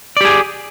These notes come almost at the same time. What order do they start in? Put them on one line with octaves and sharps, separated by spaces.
D5 G4 G#4